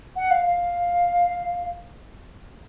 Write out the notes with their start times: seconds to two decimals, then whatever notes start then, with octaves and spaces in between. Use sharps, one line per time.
0.16 F#5
0.30 F5
0.45 F5